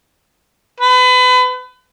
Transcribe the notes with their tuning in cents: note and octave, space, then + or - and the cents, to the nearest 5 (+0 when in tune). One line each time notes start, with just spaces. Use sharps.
B4 +30